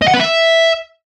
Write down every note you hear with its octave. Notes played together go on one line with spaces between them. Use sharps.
D#5
F#5
B4
E5